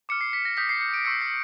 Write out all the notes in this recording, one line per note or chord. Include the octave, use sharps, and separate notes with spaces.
D6 F6 C#7
C7
B6
A#6
D#6 G6 B6
C7
C#7
D7
C#6 E6 G6 C#7
C7